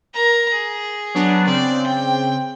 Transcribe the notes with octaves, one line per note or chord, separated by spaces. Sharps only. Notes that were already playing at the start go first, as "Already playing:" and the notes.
A#4 A#5
G#4
F#3 B3 D4
C#3 C4 D5
G5